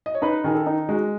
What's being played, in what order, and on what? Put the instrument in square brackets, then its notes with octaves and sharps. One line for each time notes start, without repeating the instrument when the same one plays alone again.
[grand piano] D#5
C#5
[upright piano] D#4 [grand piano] B4
[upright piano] D#3 [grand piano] G#4
[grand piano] A4
[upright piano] D#4
[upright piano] G#3 [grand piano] F#4